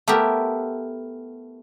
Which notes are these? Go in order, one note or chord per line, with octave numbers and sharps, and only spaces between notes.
A3 B3 E4 G4 A#4